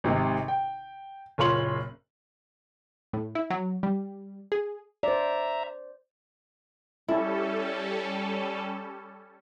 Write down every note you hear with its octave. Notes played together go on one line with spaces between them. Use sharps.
G#1 C3 D#3 G#3
G5
F#1 A#2 F4 C#5 C6 F#7
A2
E4
F#3
G3
G#4
C5 D5 E5 A#5
G3 C#4 E4 A4